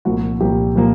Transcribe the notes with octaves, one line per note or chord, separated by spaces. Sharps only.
C2 A#2 F3 A#3 F#4
C2 A#2 F3 A#3 G4
A#2 F3 A#3